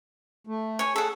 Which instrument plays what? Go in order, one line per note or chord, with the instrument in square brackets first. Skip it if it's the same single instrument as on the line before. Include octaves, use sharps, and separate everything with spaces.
[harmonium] A3
[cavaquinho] C#5 G#5
[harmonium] G#4 [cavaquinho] A4 F#5